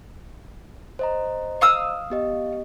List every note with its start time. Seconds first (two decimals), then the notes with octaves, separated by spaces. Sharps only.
0.99 C5 D#5 A#5
1.61 F5 D#6 E6
2.10 B3 G4 D#5